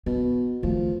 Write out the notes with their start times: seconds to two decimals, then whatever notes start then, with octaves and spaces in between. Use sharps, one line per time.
0.06 B2 B3
0.63 D#3 F3 A3